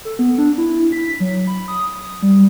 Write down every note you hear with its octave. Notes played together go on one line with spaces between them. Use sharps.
A4
B3
D4
E4
B6
F#3
B5
D#6
D#6
G3